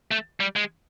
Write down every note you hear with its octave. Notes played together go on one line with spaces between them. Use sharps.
A3
G3
G#3